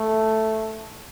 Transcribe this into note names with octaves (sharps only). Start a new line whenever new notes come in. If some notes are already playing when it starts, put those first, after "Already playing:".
Already playing: A3